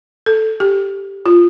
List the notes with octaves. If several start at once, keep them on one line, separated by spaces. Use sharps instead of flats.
A4
G4
F4